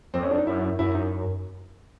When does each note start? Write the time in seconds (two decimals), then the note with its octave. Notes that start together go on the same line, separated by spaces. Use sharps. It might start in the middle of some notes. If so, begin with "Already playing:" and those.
0.14 F2 C4
0.23 C#4
0.31 D4
0.38 D#4
0.47 F#2 E4
0.79 F#2 E4
0.95 D#4